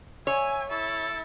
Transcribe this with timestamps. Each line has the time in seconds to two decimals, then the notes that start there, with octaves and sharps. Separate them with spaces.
0.27 C#5 E5 G#5
0.70 E4 A4